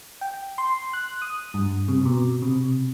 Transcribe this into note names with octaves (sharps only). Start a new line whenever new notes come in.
G5
C6
F#6
D#6
G2
C3
B2
C3